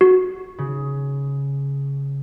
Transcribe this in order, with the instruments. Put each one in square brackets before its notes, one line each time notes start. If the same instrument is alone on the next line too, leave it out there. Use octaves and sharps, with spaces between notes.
[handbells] F#4
[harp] C#3